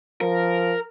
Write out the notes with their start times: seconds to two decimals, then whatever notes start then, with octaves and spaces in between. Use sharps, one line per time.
0.21 F3 A#4